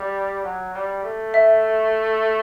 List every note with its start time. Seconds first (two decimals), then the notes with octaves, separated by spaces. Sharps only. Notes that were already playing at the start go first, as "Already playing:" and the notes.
Already playing: G3
0.44 F#3
0.74 G3
1.04 A3
1.34 E5